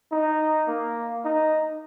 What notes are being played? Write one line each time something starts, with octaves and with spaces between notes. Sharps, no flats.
D#4
A#3
D#4